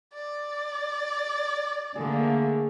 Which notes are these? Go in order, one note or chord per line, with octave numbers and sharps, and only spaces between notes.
D5
D3 A3 A#3 G#4